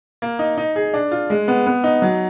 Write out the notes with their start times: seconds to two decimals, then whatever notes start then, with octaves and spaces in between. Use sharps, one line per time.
0.22 A#3
0.39 D#4
0.58 D#4
0.76 G#4
0.94 D4
1.11 F4
1.30 G#3
1.48 B3
1.67 B3
1.84 D#4
2.02 F#3